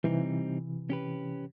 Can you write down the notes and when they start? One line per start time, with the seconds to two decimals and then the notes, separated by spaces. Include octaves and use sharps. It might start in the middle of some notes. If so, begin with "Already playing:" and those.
0.04 C3 E3 G3 C4 D#4
0.90 C#4 G4 B4